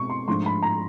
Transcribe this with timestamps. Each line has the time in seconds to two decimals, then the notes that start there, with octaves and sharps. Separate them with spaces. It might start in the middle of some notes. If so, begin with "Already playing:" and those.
Already playing: B2 G#3 C4 C#6
0.10 C6
0.27 G#2 F3 A3 D4 C6
0.46 B5
0.63 A#5